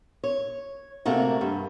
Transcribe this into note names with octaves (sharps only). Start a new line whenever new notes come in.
C#5
C3 A3 A#3 F#4
G2